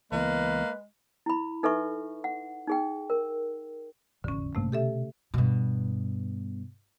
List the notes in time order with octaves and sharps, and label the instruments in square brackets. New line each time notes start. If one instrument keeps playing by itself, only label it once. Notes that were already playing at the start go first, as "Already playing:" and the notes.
[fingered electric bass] C#2 E3 B3 [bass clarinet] G#3 [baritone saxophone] A#3 [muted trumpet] B4
[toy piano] E4 B5
D#4 A4 B4 E5 C#6
F#5
D#4 G#4 G5
A#4
[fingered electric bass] E1 A1 F2 [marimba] D3 C#4
[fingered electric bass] A1 G2 A#3 [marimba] C3 A3
[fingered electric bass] B2 [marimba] G4 A4 E5
[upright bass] G2 B2